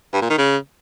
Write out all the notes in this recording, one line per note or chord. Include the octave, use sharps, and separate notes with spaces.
G2
A#2
D#3
C#3